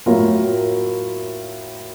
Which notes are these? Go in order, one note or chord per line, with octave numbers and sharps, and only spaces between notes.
A2 F#3 A#3 F4 A#4